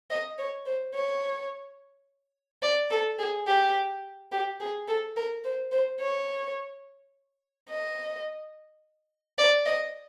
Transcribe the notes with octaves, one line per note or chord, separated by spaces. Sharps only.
D#5
C#5
C5
C#5
D5
A4
G#4
G4
G4
G#4
A4
A#4
C5
C5
C#5
D#5
D5
D#5